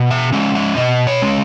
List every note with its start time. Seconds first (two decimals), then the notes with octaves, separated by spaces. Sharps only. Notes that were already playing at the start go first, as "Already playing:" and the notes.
Already playing: B2
0.11 E5
0.33 G#3 C#4 E5
0.55 E5
0.77 B2 D#5
1.07 C#5
1.22 G#3 C#4